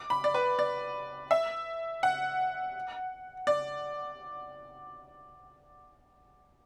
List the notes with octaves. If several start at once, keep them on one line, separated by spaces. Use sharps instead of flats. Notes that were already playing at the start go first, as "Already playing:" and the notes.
Already playing: D6
B5
D5
B4
D5
E5
F#5
D5